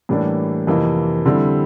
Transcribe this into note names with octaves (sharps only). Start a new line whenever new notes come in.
A2 E3 G3 A#3 D4
F2 C3 E3 A#3
D3 G3 C4 E4